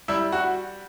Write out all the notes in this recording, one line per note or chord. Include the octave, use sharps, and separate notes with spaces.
G3 E4 E5
F#4 F#5